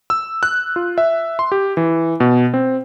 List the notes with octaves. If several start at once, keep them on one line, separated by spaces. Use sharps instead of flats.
E6
F#6
F4
E5
C6
G4
E3
B2
C4